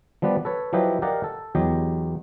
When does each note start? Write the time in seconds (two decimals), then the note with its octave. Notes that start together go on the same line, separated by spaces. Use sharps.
0.22 F3 G3 B3 B4 D5
0.45 A4 B4 C#5
0.73 F3 F#3 E4 G4 B4 D#5
1.02 G4 A#4 D5 D#5 F5 F#5
1.24 A4
1.55 E2 F#3 G4 D#5